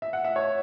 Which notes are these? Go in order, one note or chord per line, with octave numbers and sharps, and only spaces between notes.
E5
F#5
E5
C#5